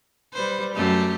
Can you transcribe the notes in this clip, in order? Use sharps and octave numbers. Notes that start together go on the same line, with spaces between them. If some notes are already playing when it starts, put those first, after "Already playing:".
G3 B4 C5
F#2 A3 G4